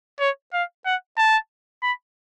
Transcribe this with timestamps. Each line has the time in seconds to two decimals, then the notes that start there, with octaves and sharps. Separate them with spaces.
0.20 C#5
0.53 F5
0.86 F#5
1.18 A5
1.82 B5